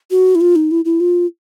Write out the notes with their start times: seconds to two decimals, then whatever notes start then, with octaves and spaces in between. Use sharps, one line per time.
0.11 F#4
0.35 E4
0.41 F4
0.56 D#4
0.71 E4
0.85 E4
1.00 F4